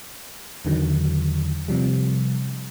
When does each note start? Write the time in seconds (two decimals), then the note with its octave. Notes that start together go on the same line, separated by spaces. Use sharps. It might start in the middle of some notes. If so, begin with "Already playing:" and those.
0.65 E2 D3 D#3 F#3
1.68 C3 F3 G3